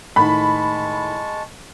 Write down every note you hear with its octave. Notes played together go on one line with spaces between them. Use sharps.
A2 D#3 G#3 A5 B5 C#6